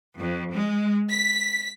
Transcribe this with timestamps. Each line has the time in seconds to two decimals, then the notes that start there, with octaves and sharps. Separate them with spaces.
0.20 F2
0.54 G#3
1.10 B6